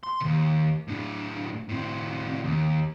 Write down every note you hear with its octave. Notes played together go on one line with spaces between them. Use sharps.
C6
D#2 C3
A2 D4
A2 C4
D#2